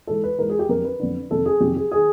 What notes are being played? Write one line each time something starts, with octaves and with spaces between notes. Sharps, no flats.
G#2 E3 A4
B4
G#2 E3 A#4
G#4
G4
F2 D3 A#4
B4
F2 D3
F2 C3 D#3 A4
G#4
F2 C3 D#3 G4
G#4
D#3 G#4